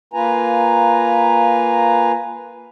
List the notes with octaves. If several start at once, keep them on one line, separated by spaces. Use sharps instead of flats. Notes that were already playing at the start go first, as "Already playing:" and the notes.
A#3 F4 B4 G#5 A#5